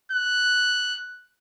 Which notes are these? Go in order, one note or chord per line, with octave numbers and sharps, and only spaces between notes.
F#6